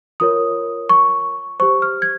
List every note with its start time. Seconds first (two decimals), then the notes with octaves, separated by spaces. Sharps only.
0.20 F4 A#4 C#5 D#6
0.89 C#6
1.60 G4 C5 C#6
1.82 F6
2.02 G#6